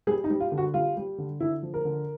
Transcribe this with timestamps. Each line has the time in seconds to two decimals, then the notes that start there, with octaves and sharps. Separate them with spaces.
0.07 G3 G#4
0.24 D#4
0.30 G3
0.40 F4
0.52 D3
0.57 F#4
0.74 G3 F4
0.97 G3
1.18 D3
1.40 D3 E4
1.63 F3
1.74 A#4
1.85 D3